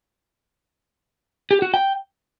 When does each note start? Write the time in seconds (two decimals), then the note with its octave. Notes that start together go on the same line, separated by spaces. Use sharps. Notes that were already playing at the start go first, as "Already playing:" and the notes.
1.51 G4
1.62 F#4
1.74 G5